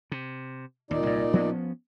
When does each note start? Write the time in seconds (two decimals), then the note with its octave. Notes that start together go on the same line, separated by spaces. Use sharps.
0.12 C3
0.91 D#2 A#2 D#4 D5
1.03 C2 G#2
1.33 F3 B3 C#4